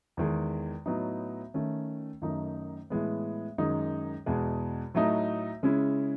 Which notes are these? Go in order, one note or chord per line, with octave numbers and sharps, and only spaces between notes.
E2 D#3 G#3
A2 F#3 B3 D#4
D#3 A3 C#4
F#2 D#3 A3 D#4
A2 E3 G#3 B3
F#2 D#3 G#3 D#4
E2 B2 G#3
A2 F#3 A3 D#4
C#3 G#3 C#4 E4